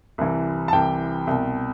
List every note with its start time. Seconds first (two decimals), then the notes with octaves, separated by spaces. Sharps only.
0.18 C2 C3 E3
0.68 A5
0.73 C2 C3 E3 G5
1.27 C2 B2